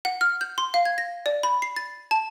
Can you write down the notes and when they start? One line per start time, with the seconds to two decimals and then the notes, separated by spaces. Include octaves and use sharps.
0.05 F#5
0.21 F6
0.41 G6
0.58 C6
0.74 F5
0.85 G#6
0.98 A#6
1.26 D5
1.43 B5
1.62 C7
1.76 A6
2.11 A5